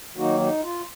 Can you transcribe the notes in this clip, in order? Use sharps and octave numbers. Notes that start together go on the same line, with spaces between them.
D#3 F#3 A#3 D#4 F#4
D#4
F4